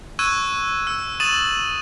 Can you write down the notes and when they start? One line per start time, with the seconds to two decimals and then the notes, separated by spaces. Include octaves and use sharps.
0.19 C#6 E6 F#6 G#6 D#7
0.87 E6
1.20 C#6 D#6 A6 D#7 E7 F#7